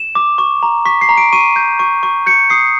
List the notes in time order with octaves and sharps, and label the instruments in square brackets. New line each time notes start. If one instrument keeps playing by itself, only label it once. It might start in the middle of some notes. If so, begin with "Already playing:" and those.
Already playing: [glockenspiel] E7
D6
C#6
A#5
C#6 B6
C7
A#5
D7
C#6 D#7
G6
C#6
C#6
G6 C#7
D#6 C7